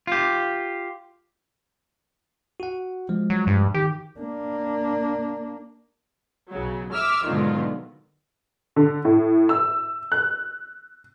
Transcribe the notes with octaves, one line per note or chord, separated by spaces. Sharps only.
F4 G4
F#4 F#5
F3 G#3
F#3
G2
D#3 G4
A#3 D4
B1 C#3 F#3
E5 D6 E6 F6
G#2 B2 D3 D#3 F#3 F4
D3
A2
E6
F#6